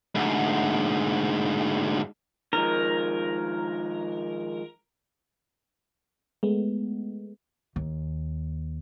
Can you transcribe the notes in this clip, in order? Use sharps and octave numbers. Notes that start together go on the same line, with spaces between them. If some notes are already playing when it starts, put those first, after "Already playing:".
D2 G#2
D#3 F3 G#3 A#4
G#3 A3 B3
D#2